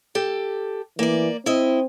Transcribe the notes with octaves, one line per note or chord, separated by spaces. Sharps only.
G4 A4
E3 A#3 D5
C4 E4 D#5